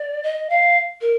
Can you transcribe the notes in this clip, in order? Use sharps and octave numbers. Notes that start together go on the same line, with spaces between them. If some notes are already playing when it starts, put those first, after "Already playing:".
Already playing: D5
D#5
F5
A#4